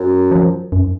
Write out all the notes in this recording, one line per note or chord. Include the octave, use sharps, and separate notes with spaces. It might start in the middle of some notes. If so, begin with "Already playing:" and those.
Already playing: F#2
F3
F#2